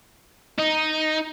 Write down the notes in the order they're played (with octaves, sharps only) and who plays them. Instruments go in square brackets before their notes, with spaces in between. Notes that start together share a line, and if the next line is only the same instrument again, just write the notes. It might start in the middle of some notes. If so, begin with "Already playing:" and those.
[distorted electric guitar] D#4